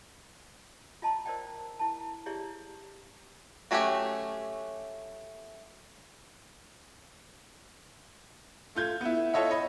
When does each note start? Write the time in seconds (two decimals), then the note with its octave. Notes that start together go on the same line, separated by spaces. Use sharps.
1.02 F4 D#5 A5 A#5 C6
1.26 A#4 C5 D5 D#5 G5
1.79 E4 A5
2.26 E4 G4 G#4 C#5 D5 E5
3.71 F#3 A3 C#4 F#4 G4
8.75 A3 F4 G6 G#6
9.01 B3 E4
9.33 F4 A4 C#5 D#5 E5 F#5
9.50 C#5 D#5 B5